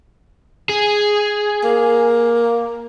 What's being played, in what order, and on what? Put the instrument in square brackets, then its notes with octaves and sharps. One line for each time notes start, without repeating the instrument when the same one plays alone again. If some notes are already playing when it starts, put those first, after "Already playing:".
[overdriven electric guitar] G#4
[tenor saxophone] A#3